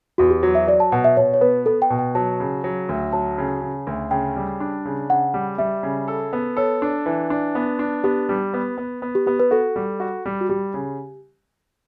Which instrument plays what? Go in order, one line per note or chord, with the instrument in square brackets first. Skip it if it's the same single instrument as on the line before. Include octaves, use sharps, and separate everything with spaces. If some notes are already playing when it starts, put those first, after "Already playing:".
[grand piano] E2 [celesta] F#4
[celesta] G4
[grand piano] F#3 [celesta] F#4
[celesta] E5
[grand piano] F#3 [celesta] D5
[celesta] A5
[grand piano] B2 [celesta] F#5
[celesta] E5
[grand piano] B2 [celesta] C#5
[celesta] C#5
[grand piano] B3 [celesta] B4
[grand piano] B3 [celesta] A4
[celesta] G5
[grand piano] B2
[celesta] G5
[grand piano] F#3 [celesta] A5
[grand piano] C#3
F#3
D2
[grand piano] F#3 [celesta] A5
[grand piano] C#3
C#3
D2
[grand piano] C#3 [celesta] G5
[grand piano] G3
D4
C#3
[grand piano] C#3 [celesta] F#5
[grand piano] G3
[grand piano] G3 [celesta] E5
[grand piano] C#3
A4
B3
[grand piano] A4 [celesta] C#5
[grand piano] D4
E3
D4
B3
D4
[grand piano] B3 [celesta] G4
[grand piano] G3
B3
B3
B3
[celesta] G4
[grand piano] B3 [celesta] G4
[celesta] B4
[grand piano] F#4 [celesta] A4
[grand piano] G3
F#4
G3
[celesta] F#4
[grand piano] G3 [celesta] G4
[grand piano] C#3